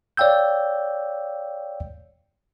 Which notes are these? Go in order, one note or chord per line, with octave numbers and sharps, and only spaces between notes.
C#5 D5 F5 G5 E6 G6